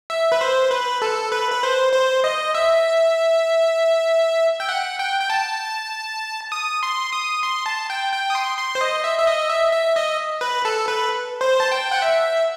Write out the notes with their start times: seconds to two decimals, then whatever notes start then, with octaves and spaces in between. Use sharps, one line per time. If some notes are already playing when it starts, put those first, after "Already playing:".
0.10 E5
0.32 B4
0.41 C5
0.71 B4
1.02 A4
1.32 B4
1.51 B4
1.63 C5
1.93 C5
2.24 D#5
2.55 E5
4.60 G5
4.69 F#5
4.99 G5
5.21 G5
5.30 A5
6.52 D#6
6.83 C6
7.12 D#6
7.43 C6
7.66 A5
7.90 G5
8.12 G5
8.30 D#6
8.35 C6
8.58 C6
8.75 C5
8.81 D#5
9.04 E5
9.19 E5
9.27 D#5
9.50 E5
9.73 E5
9.96 D#5
10.41 B4
10.65 A4
10.88 B4
11.41 C5
11.60 A5
11.72 G5
11.92 F#5
12.02 E5